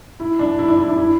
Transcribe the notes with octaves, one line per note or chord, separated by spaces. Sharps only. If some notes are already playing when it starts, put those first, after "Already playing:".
E4
D4
E4
D4
E4
D4
E4